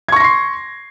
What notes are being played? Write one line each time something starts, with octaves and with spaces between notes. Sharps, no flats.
C6 C#6 G#6 A#6 C7